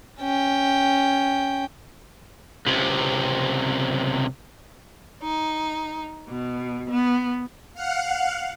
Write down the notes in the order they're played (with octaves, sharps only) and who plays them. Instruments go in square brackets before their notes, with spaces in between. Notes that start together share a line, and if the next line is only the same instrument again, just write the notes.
[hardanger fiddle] C#4 G5
[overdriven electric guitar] C#2 C3
[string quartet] D#4
B2
B3
[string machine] F5 F#5